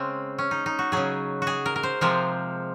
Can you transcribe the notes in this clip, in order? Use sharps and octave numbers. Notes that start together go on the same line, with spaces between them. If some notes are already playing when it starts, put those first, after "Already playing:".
Already playing: C#3 G#3 C4
C#4
D#4
D#4
F#4
C#3 F#3 G#4
F#4
G#4
A#4
A#4
C5
C3 F3 G#3 A#4